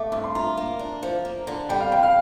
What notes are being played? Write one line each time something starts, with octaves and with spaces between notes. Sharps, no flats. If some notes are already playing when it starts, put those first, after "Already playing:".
Already playing: A3 D6
G2 D6
C6
F4 A#5
A#3
D4
F3
A#3
D3
G3 G5
F5
F2 G5
F5